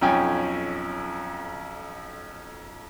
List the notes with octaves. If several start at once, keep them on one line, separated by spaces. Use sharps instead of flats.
B1 F2 C#4 G5 G#5